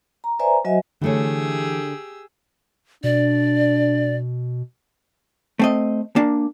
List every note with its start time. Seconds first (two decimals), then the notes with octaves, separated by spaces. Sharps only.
0.24 A#5
0.39 B4 C5 D5 E5 G#5 A#5
0.65 F#3 F#4 C5 D#5 E5 G#5
1.01 D3 E3 A3 G4 G#4 C#5 E6
3.04 B2 D4 D5
5.59 A3 C4 D#5
6.16 A#3 D4